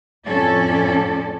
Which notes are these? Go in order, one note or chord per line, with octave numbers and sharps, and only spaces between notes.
F2 A2 C#4 A4 D5